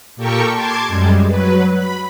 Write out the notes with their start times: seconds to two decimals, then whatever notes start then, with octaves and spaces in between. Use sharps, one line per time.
0.16 A#2 G4 A4 A#4 G5 C#6
0.53 A5 C6 D6 G#6
0.87 F#2 G3 G#3
1.27 F#3 B4
1.74 B5